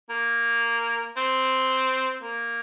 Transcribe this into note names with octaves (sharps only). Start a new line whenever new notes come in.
A#3
C4
A#3